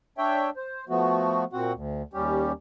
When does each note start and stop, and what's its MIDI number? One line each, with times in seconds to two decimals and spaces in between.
0.18 0.50 62
0.18 0.50 73
0.18 0.50 76
0.18 0.50 79
0.57 0.85 72
0.89 1.44 53
0.89 1.44 57
0.89 1.44 59
0.89 1.44 66
1.53 1.72 46
1.53 1.72 60
1.53 1.72 66
1.53 1.72 78
1.74 2.02 38
2.14 2.52 39
2.14 2.52 55
2.14 2.52 61
2.14 2.52 67